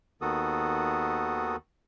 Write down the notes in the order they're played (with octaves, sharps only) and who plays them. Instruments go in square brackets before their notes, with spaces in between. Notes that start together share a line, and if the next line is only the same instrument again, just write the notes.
[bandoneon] D#2 D#3 B3 F#4 A4 D#6